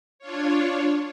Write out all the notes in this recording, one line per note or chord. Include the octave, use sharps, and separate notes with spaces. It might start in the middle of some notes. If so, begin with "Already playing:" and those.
D4 F4 C#5